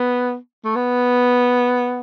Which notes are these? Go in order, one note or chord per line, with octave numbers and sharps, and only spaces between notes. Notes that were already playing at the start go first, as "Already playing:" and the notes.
Already playing: B3
A3
B3